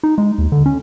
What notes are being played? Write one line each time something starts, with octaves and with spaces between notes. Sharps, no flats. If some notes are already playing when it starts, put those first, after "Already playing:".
D#4
G#3
D#2
D3
C#4